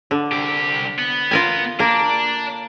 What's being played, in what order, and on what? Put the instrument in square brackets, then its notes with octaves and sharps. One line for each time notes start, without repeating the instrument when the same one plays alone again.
[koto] D3
[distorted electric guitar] C2 G4
B3
[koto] F4 A#4 G#5
[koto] A#3 [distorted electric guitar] D4